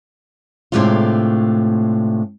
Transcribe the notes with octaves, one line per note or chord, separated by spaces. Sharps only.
A2 C3 G#3 A3 D4 F4